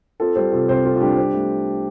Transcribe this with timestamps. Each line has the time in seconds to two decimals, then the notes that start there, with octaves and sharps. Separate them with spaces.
0.20 C4 F4 A4
0.36 G3 G4 C5
0.52 C3 F4 A4
0.68 C2 G4 C5
0.84 C4 F4 A4
0.95 F4
1.00 G3 D4 G4
1.17 C4
1.34 A3